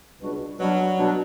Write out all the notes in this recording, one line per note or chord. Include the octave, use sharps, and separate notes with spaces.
C#2 B2 G3 D4 F#4
B2 F#3 G3 D4
B2 G3 D4